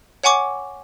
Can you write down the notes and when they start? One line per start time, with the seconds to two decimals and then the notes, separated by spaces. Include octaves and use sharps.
0.24 C#5 F#5 G#5 C#6 D6